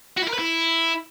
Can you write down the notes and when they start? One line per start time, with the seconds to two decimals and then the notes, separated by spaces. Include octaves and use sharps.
0.17 F#4
0.23 E4
0.28 A#4
0.34 B4
0.39 E4